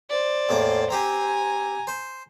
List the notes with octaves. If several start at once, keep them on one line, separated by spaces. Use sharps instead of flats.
C5 D5
E2 A2 A#3
C4 G4 G#5 A#5
C5